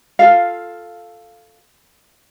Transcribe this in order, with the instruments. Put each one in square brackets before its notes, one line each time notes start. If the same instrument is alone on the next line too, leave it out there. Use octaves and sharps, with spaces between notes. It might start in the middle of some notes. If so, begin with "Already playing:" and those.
[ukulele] F4 A4 F5